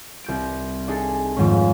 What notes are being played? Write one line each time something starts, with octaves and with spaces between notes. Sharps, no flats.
C2 G6 D7
D4 D#4 G#4 A4
F2 G#2 D#3 G#3 C#4